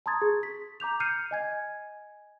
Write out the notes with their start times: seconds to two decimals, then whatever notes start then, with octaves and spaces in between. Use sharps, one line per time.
0.06 A5 A#5 C6 D#6 G#6 A6
0.22 G#4
0.43 B6
0.80 A#5 D6 G6 F7
1.00 F6 G6 C7 C#7 D#7
1.31 D#5 G#5 G#6